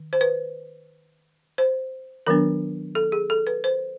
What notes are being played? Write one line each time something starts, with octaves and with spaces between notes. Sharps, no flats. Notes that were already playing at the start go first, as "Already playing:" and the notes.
Already playing: D#3
C5
B4
C5
D#3 F#3 B3 D4 A#4
A4
G#4
A4
B4
C5